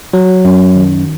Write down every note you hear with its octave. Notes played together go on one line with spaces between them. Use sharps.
F#3
F#2
D#3